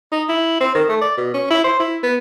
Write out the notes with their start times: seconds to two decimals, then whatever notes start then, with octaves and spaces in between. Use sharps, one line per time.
0.12 D#4
0.29 E4
0.61 C4
0.75 D#3
0.89 A3
1.01 D5
1.17 B2
1.34 C#4
1.51 E4
1.64 C5
1.80 E4
2.03 B3